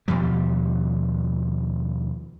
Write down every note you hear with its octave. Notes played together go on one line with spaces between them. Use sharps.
D#2 B2 F3 G3